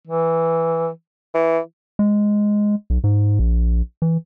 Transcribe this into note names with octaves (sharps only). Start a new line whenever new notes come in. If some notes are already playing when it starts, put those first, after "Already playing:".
E3
E3
G#3
B1
G#2
A#1
E3